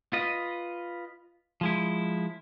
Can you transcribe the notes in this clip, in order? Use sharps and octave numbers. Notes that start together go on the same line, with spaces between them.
F4 B4 D#5
F3 G#3 E4